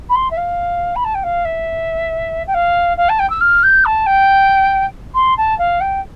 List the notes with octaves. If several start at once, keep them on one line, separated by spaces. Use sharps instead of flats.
B5
C6
E5
F5
B5
A5
G5
F5
E5
G5
F5
F5
A5
G5
E6
F6
G6
A5
G5
C6
A5
F5
G5